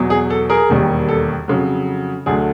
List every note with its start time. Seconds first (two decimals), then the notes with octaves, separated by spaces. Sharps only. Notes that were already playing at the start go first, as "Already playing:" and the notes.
Already playing: E2 B2 F#3
0.10 G#4
0.30 A4
0.49 G#4 A#4
0.69 E1 D#2 D#3 G3
1.08 A4
1.48 F2 C#3 F#3
2.26 D2 D3 F#3 G#4